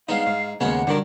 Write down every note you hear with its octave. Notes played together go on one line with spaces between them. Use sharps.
G#3 B3 D4 D#4 F5
G#2
D#2 A2 C#3 G#3 A#3 B3 F#5
G2 D3 D#3 F#3 A#4